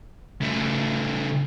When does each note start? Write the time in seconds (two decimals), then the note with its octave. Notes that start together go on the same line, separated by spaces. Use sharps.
0.41 C#3 A3